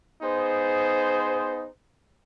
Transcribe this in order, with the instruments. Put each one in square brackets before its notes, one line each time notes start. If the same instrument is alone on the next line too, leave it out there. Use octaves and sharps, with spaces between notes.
[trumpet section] B3 D#4 G#4 C5